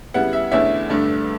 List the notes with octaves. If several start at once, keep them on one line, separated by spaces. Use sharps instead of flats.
C#3 G3 B3 E4 F#5
E5
E2 D3 A3 C#4 E4 E5
G2 D3 A3 D4